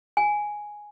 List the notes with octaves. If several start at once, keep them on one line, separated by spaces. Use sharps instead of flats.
G#5